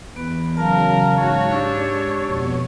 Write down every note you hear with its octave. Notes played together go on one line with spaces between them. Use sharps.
E2 B3 B4
C#3 F#3 A#4 F5 A5
G#2 F#4 C#5
G#3 D4 G4 C#6 E6
F2 B2 B3